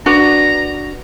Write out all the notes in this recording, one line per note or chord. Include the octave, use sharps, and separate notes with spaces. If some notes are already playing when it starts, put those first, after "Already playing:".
D4 F#4 B4 A#5